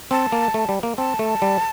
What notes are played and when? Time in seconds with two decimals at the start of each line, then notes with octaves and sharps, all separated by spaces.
0.11 C4 A5
0.32 A#3
0.54 A3
0.69 G3
0.83 A#3
0.98 C4 A5
1.19 A3
1.42 G3